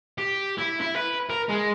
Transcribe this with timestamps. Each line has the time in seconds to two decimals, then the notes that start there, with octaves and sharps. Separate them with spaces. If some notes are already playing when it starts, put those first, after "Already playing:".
0.18 G4
0.58 E4
0.80 E4
0.96 B4
1.30 A#4
1.49 G#3